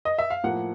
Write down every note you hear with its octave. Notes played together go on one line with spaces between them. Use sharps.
D#5
E5
F5
A2 F3 A#3 F#5